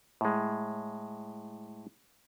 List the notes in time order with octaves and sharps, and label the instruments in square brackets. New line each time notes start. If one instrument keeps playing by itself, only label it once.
[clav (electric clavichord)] A2 G#3